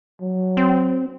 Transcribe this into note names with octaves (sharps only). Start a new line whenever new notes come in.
F#3
C4